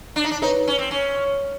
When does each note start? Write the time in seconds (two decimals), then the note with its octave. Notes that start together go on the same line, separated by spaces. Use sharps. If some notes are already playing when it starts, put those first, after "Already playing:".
0.16 D4
0.24 D#4
0.31 D4
0.42 D#4 B4 C#5
0.67 C#4
0.79 C4
0.91 C#4